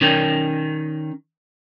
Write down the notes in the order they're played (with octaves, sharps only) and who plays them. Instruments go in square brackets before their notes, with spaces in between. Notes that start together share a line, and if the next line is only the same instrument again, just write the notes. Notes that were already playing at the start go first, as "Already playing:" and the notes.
[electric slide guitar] D#3 C#4 A#4 G5